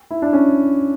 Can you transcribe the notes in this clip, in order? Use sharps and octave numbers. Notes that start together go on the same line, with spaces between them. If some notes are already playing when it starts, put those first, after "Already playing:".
E4
D4
C#4